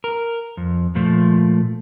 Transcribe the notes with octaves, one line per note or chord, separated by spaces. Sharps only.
A#4
F2
A#2 F3 A3